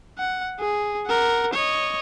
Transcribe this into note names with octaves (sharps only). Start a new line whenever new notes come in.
F#5
G#4
A#4 F#5
C#5 D#5